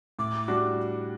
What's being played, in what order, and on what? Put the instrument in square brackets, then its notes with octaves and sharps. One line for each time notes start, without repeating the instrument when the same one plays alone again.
[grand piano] A2 [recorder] D6
[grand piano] G3 D4 F#4